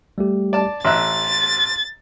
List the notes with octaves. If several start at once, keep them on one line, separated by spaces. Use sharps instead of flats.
G3 A3 G4
D5 A5
A1 E5 C6 F#6 A6